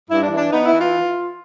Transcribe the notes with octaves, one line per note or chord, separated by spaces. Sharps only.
G2 E4
D4
E3
D4
B3 D#4
E4
E3
F4